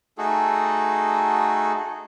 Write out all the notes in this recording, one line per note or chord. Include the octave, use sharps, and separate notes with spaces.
A3 D#4 F#4 G#4 A4